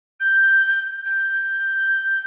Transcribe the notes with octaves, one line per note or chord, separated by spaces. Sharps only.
G6
G6